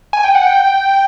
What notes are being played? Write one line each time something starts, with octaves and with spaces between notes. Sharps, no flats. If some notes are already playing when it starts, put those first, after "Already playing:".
G#5
G5
F#5
G5